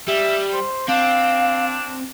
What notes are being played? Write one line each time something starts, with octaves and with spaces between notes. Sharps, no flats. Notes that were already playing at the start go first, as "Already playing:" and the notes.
G3 E5
C5
C4 D4 F5